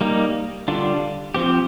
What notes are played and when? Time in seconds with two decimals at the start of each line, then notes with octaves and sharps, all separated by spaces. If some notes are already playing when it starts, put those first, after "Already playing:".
0.01 G3 A#3 D#4
0.68 D3 G3 D4 F4
1.34 F3 C4 G4